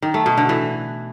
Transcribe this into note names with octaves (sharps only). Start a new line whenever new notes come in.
D#3
A3
B2
D3
E3